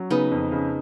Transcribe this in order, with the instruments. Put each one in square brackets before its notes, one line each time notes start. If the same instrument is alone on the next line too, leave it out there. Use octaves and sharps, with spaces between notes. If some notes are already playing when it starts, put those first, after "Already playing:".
Already playing: [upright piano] F#3 [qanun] C#4
[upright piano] C#3 [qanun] B3 D#4
[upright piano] F2
C#3